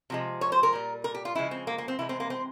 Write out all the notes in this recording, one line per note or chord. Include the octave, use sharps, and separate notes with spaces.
C3 F3 G#3
C#5
C5
A#4
A#2 G3
A#4
G4
F4
C#3 F3 G#3 E4
C4
A#3
A#3
C4
C3 E3 G#3 E4
C4
A#3
C4